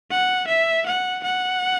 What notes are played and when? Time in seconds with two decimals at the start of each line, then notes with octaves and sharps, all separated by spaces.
0.11 F#5
0.48 E5
0.86 F#5
1.24 F#5